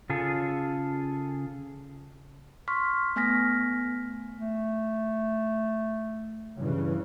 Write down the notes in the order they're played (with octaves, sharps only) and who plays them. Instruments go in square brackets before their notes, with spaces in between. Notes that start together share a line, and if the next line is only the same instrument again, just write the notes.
[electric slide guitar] C#3 F4 G#4 A4
[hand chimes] C6 C#6 F6 B6
A3 B3 G#5 F6 A#6 B6
[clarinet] A3
[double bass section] G2 C#3 E3